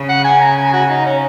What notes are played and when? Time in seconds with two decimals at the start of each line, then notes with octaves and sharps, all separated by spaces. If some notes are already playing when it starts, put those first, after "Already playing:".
Already playing: C#3
0.09 F#5
0.24 G#5
0.41 A#5
0.57 G#5
0.73 F#4
0.90 D#4
1.06 C#4